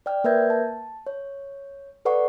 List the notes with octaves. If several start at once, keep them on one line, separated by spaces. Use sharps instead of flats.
D5 G5 F6
A#3 A#4 B4 E5 G6 G#6
A5
C#5
A4 B4 D5 F#5 C#6